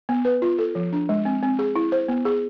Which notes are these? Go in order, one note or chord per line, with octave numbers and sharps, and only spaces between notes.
B3
B4
F4
A4
F3
D4
G#3
C4
C4
G#4
E4
C5
B3
G#4